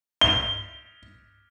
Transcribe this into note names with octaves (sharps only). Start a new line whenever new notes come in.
G7